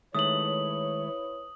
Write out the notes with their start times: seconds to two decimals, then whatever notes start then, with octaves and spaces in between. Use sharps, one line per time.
0.15 D#3 G#3 A3 E4 B4 C#5 D#6 F#7